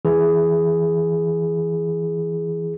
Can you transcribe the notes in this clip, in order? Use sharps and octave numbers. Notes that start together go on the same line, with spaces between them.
E3 G#4